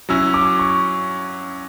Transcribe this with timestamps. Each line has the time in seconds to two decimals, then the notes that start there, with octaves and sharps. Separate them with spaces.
0.09 F#3 C#4 E4 E6
0.34 D6
0.59 C#6